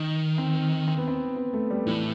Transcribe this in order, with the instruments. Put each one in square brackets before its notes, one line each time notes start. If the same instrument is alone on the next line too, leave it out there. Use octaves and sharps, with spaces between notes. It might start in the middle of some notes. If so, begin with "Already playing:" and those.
Already playing: [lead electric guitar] D#3 [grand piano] D#4
[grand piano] C4
C4
B3
C4
B3
A3
G3
[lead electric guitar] A2 [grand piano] E3